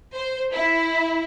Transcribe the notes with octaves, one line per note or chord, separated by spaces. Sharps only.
C5
E4